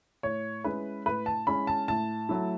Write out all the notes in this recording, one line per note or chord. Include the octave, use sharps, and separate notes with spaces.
A2 C#5
G#3 C#4 E4 B4
A2 B4
A5
G#3 C#4 E4 B5
A5
A2 A5
F#3 A3 E4